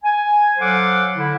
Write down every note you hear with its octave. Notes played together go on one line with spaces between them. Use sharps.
G#5
F#3 A4 C5 F5 F#5 D6
D3 E4